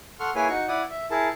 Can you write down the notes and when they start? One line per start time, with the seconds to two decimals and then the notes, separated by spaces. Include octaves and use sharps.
0.20 A4 F#5 C6 C#6 F6
0.35 A#3 E4 G#4 B4 C#5 G#5
0.49 D#4 F#4 C#6
0.68 E4 D5 F#5 D#6
0.90 E5
1.10 E4 G#4 A#4 A5